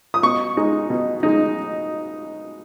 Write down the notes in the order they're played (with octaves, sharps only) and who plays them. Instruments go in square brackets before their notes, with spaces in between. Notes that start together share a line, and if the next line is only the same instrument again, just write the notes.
[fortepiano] D#6
B2 C#6
G#3 D#4
B2
G#3 D#4